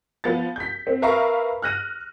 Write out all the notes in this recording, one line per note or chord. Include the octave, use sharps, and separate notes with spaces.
F3 B3 A6
G6 B6
C4
A#4 B4 E5 F5 A#5 C#6
F6 F#6 A#6 D#7